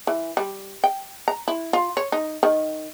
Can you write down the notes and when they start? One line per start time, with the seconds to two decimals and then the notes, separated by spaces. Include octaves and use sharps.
0.07 E3
0.37 G3
0.84 G5
1.28 A#5
1.48 E4
1.73 F4
1.97 C#5
2.12 D#4
2.43 D#3